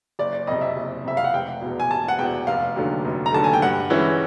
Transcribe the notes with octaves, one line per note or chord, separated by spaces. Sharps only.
F#1 D5
D5
F2 C3 D#5
E5
F#1
F2 C3 E5
F5
F#5
F1 G5
E2 B2
G#5
F1 A5
F#5
E2 B2 G5
F1 F5
D#2 D3 F#3 A3
F1
A#5
D#2 D3 F#3 A3 A5
G#5
G5
G2 F#5
E3 G#3 C#4 E4